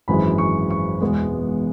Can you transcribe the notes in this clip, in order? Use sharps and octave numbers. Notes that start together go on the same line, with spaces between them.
G#1 F#2 E3 G#3 B5
C#6
C#6
E1 E2 E3 G#3 B3